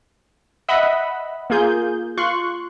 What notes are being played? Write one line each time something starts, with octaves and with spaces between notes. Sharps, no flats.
D#5 E5 F#5 B5
A#3 F4 G#4 G6
F4 C6 C#6 F#6